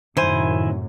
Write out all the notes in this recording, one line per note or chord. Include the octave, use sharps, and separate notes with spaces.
F#2 A2 C3 D#3 E4 C5 G#5